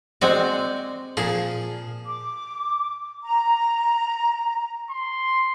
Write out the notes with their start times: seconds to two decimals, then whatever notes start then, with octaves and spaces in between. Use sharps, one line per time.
0.22 G#3 C4 F#4 D5
1.17 A#2 F3 G#4
2.06 D6
3.22 A#5
4.90 C6